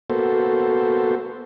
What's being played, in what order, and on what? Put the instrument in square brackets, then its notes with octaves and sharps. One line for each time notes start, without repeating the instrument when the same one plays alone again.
[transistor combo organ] A#3 B3 F#4 A4 C5